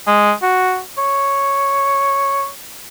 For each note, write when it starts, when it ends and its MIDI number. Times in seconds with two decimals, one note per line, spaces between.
0.07 0.32 56
0.42 0.80 66
0.98 2.48 73